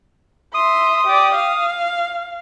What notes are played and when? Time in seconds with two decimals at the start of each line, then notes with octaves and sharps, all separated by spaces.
0.54 E5 C6 D#6
1.06 G4 D5
1.35 F5